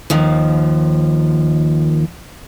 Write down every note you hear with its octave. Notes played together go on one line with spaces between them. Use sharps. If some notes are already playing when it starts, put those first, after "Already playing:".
D#2 D#3 F3